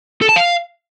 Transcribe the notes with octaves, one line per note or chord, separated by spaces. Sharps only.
A4
A5
F5